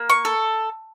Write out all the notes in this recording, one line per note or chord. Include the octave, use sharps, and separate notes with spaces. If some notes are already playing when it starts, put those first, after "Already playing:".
Already playing: A#3
C#6
A4